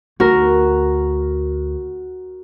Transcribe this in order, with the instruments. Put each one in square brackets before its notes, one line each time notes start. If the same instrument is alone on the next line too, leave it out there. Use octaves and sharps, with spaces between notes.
[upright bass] D2 [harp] F#4 A#4